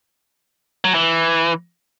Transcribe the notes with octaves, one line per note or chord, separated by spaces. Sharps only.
F#3
E3